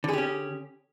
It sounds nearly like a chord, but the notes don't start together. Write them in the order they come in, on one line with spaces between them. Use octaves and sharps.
D3 G#4 G4 C#4